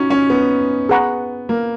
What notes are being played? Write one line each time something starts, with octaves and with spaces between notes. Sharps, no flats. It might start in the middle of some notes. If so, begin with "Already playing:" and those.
Already playing: C#4 D#4 F#4
C#4
B3
G#4 B4 F#5 A#5 C#6
A#3